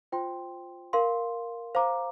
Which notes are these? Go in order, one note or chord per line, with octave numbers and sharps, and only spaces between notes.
F4 C5 G5 C6
A#4 F5 C6
C5 F5 A#5 D6